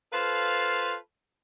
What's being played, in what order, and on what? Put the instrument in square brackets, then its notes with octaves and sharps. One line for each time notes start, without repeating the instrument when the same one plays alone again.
[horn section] F4 A4 B4 C5 F5